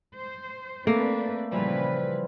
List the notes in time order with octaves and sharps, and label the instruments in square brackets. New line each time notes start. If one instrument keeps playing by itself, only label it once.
[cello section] C5
[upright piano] A3 [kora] A#3 [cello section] C4 D4 B4
[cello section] A#2 C#3 B4 [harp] E3 F3 G3